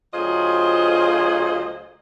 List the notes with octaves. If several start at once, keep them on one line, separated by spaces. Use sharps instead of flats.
D2 F#3 F4 G#4 C5 D#5